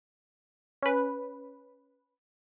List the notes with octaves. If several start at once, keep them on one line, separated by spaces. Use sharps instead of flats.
C#4 B4